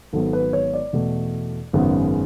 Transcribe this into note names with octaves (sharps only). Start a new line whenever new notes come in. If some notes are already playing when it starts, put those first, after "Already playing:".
G#1 G#2 F#3 B3 A4
B4
C#5
D5
E2 B2 A3
G#1 F#2 C#3 G#3 B3